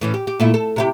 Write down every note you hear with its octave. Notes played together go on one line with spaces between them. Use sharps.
A2 E3 C#4
G4
G4
A#2 A3 E4
A4
C3 E4 G4